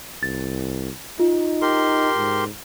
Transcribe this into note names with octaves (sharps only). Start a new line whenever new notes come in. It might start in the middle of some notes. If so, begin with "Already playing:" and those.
C2 A6
D#4 F4
G4 A#4 C6
G#2